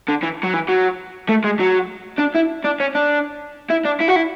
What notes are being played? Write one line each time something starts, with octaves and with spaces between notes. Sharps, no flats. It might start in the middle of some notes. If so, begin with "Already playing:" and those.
D3
E3
F#3
E3
F#3
A3
G#3
F#3
D4
E4
D4
C#4
D4
E4
D4
E4
F#4
E4